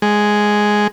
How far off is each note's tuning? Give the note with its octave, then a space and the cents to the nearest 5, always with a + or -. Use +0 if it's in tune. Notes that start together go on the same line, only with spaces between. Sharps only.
G#3 +0